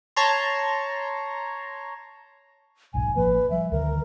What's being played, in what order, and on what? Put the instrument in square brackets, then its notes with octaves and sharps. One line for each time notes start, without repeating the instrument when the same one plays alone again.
[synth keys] C#5 A5 A#5 C6
[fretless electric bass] D#1 B1 G#2 [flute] G#5
[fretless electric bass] A1 F3 A#3 [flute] B4
[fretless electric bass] F3 G3 [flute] E5
[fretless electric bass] D2 D3 D#3 [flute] A#4